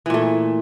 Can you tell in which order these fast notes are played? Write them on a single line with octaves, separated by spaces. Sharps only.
E3 A#2 A3